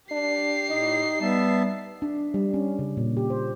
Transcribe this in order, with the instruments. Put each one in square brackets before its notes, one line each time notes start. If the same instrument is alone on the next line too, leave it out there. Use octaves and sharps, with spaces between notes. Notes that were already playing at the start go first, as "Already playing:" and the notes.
[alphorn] D4 [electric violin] G4 C7
[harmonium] A2 [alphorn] D#4 [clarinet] D#5
[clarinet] G3 [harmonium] B3 E5 A5
[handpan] D4
G3
C#4
C#3
A#2
G4
C5